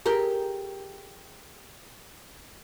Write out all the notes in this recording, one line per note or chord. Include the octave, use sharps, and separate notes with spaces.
G4 G#4 A#4